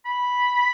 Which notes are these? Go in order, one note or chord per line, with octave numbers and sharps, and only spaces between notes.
B5